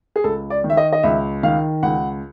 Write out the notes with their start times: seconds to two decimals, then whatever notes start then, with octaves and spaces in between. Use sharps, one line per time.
0.16 G#4
0.24 C#2 A4
0.50 D5
0.64 D#3
0.70 E5
0.77 D#5
0.93 D#5
1.03 C#2 E5
1.43 D#3 F5
1.83 C#2 F#5